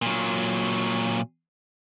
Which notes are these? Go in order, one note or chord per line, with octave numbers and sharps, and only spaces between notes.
A#2 F#3